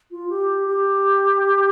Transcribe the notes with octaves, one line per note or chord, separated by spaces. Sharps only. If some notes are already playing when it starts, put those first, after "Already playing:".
F4
G4
G4